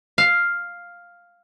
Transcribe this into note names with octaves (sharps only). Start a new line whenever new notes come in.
F5